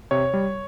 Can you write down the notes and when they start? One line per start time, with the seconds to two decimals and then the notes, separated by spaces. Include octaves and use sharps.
0.11 C3 C#5
0.34 G3